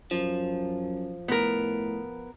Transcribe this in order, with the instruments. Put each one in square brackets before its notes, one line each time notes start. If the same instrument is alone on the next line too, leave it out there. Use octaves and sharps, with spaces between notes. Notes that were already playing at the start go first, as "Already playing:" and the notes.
[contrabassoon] F#2 [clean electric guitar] F3
[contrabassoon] A2 [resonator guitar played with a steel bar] B3 A#4